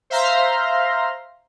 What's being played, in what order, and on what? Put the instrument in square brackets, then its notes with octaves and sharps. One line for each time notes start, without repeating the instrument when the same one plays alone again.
[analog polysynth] C5 E5 F5 A#5 C6